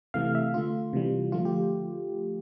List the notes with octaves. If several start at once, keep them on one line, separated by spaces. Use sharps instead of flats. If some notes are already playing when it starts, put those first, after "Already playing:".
C3 E3 A3 F5
E5
D3 A3 F4
C3 E3 G3
D3 F3 A3 F4
G4